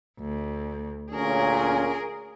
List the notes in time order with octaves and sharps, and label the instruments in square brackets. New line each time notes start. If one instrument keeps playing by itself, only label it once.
[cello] D2
[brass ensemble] D2 A#2 C#4 [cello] G#4 A#4